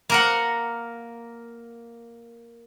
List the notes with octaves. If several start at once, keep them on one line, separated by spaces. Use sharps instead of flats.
A#3 A#4 F#5